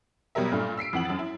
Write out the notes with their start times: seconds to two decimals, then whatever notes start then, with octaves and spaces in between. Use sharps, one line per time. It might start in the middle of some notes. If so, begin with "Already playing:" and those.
0.35 B2 F#3 G3 A#4 E5
0.52 G2 A#2 A3 D4
0.77 E6 B6 C7 D7
0.93 F2 E3 F#5 F#7
1.05 F#2 A6
1.19 E4